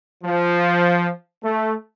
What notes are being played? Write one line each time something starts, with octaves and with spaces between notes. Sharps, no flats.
F3
A3